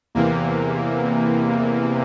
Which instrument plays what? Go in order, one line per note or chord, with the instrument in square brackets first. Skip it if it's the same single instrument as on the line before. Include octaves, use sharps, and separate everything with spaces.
[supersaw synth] E2 C3 E3 A#3